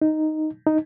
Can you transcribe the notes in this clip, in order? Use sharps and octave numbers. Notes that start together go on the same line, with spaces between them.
D#4
D#4